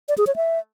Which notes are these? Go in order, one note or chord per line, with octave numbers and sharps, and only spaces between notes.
D5
G#4
C#5
E5